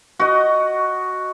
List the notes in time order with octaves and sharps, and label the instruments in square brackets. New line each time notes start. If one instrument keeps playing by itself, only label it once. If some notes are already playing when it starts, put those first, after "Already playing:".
[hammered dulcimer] F#4 D#5